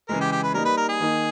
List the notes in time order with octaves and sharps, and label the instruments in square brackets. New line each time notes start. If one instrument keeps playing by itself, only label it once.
[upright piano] C#3 E3 G#3 [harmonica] A#4
[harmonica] G4
G4
B4
[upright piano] G3 A#3 D#4 [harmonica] A#4
[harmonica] B4
A#4
G#4
[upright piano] D#3 A#3 D#4